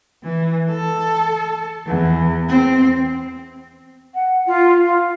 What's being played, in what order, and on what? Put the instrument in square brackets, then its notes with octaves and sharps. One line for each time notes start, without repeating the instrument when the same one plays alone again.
[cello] E3
A4
E2
C4
[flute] F#5
F4
F5